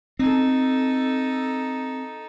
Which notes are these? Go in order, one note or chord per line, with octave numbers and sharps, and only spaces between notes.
C4 D#4 A4